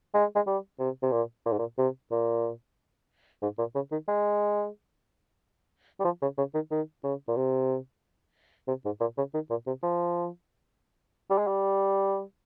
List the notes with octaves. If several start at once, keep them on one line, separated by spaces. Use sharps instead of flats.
G#3
G#3
G3
C3
C3
A#2
A#2
G#2
A#2
C3
A#2
G#2
A#2
C#3
D#3
G#3
G3
F3
C#3
C#3
D#3
D#3
C#3
A#2
C3
C3
G#2
A#2
C#3
D#3
A#2
C3
F3
G3
G#3
G3